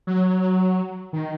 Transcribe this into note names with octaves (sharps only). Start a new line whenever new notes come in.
F#3
D#3